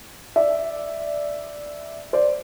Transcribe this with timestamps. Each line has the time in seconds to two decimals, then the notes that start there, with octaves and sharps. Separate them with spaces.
0.36 D5 E5
2.13 C5 D5